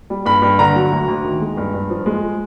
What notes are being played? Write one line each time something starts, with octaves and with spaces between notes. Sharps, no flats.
G3
G2 B5
G2
D3 A#5
F#3
D2
D2
D#3
G#3
G2
G2
F3
G#3